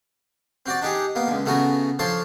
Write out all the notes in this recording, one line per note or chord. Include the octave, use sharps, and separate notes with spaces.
C4 F#4 D5
D4 D#4 G4 G#4
A#3 B3
C#2 D3
C#3 A3 B3 F#4 G#5 A#5
F3 D4 A4 C#5 C6